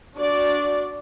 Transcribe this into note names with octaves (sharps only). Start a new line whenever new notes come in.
D4 F#4 D5